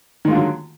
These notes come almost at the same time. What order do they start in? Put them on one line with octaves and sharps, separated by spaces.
D#3 G#3 F4 D3 F#3